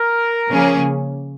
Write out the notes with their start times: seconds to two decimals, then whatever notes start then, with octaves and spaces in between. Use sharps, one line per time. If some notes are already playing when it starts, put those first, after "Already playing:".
Already playing: A#4
0.50 C#3 F3 A#3 C#4 G#4